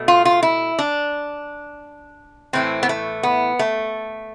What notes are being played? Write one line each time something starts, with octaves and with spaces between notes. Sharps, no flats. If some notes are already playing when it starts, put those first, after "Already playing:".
Already playing: B2 A3
F4
F4
E4
D4
A2 E3 A3 C4
B3
A3
B3
A3